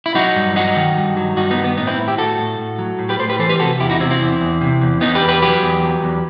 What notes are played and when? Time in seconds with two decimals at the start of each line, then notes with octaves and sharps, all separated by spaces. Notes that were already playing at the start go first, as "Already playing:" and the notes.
0.06 E4
0.15 F#3 D#4 F#4
0.36 G2
0.56 F#3 D#4 F#4
0.76 D#3
0.97 G2
1.17 F#3
1.37 G2 D#4 F#4
1.51 B3 D#4
1.57 D#3
1.64 B3
1.77 A2 B3 D#4
1.87 C4 E4
1.98 A2
2.08 E4 G4
2.18 A2 F#4 A4
2.38 A2
2.59 A2
2.79 F#3
2.99 A2
3.09 G4 B4
3.19 A2 A4 C5
3.29 G4 B4
3.39 E3 A4 C5
3.49 G4 B4
3.60 C3 F#4 A4
3.79 E2 E4 G4
3.90 D#4 F#4
4.00 C3 C4 E4
4.10 C4 E4
4.21 E2
4.40 E2
4.61 C3
4.81 E2
5.01 E2 B3 D#4
5.15 G4 B4
5.21 E2
5.29 G4 B4
5.42 F#3 G4 B4
5.63 E2
5.83 F#3
6.03 E2